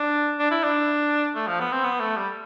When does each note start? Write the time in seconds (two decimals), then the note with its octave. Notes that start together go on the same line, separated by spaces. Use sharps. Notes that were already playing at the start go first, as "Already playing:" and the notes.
Already playing: D4
0.39 D4
0.51 E4
0.63 D4
1.35 A3
1.47 F3
1.60 B3
1.72 C4
1.84 B3
2.00 A3
2.16 G3